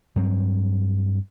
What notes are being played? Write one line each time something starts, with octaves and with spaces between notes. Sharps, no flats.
G2 F#3 C4